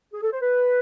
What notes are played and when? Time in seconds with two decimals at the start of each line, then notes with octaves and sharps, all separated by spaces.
0.13 G#4
0.22 A4
0.32 C5
0.41 B4